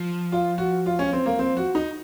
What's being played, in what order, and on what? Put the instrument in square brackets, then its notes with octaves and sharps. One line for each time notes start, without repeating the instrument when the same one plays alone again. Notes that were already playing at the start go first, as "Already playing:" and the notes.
Already playing: [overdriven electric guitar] F3
[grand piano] F4
F#4
F4
C#4
C4
A#3
C4
F#4
D#4